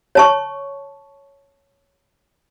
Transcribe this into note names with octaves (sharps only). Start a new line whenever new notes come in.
C#5 A5 C#6